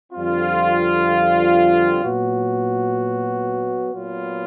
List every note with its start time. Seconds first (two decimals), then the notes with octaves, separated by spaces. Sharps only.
0.13 F2 D3 G3 C4 F4
2.03 A#2 F#3 B3 F#4
3.93 A#2 F#3 B3 F4